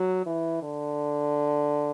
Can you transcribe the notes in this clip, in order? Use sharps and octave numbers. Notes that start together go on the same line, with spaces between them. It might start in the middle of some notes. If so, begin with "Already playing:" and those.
Already playing: F#3
E3
D3